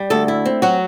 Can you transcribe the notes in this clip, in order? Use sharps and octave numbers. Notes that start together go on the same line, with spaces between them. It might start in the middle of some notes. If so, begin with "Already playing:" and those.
Already playing: G3
D2 A4
E4
C4
F#3 F#4